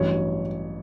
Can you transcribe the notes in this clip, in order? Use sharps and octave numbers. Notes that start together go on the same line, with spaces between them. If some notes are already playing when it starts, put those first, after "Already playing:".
Already playing: A1 G2 F#3 C#5